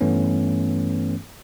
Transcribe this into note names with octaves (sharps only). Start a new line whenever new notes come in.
G2 E3 A3 B3 C#4